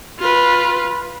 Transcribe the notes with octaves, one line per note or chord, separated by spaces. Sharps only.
F4 B4